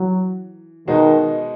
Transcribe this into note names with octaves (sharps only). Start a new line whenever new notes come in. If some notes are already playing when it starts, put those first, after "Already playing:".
Already playing: E3 F#3
B2 D#3 G#3 D#4 F#4